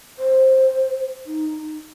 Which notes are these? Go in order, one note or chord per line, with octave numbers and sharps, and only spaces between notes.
C5
D#4